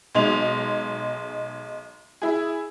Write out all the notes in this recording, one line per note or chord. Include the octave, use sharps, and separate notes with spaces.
B1 G#3 D#4 F7
E4 G#4